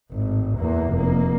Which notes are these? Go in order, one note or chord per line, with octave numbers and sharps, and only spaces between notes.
G#1 A2
E2 A#3
F1 A#3